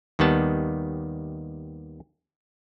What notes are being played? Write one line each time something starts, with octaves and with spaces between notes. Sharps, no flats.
D#2 D#3 G3 B3 A5